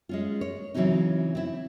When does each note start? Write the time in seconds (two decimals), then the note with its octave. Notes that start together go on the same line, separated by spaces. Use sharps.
0.09 G#3 C#4 F4
0.41 C#5
0.74 C#3 E3 F#3 C4 C#4 D#4
1.35 C4 E4